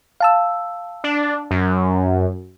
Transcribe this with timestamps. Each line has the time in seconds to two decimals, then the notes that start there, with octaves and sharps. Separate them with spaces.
0.20 F5 A5 E6
1.04 D4
1.51 F#2